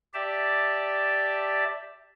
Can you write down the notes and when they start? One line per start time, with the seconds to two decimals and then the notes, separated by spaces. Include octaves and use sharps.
0.14 G4 D5 E5 A5